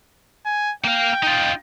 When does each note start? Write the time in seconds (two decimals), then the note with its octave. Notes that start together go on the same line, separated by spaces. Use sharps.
0.46 G#5
0.84 A#3 F5 G5
1.23 D#4 F4